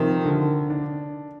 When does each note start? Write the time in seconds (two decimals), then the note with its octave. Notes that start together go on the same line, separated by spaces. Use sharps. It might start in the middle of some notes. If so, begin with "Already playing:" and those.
Already playing: C3 D#3 F3
0.25 D3
0.70 D4